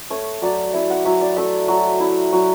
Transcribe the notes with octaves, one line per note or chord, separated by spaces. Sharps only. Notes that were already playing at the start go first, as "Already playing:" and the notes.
A3 C#5
F#3 D5
E4 E5
F#5
F#3 E5
D5
A3 E5
F#3
E4
F#3